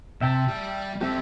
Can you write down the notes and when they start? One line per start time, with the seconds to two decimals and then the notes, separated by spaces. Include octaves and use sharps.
0.21 C3 E5 G5 A5
0.48 G3 G4
1.01 C4 G4 A4 E5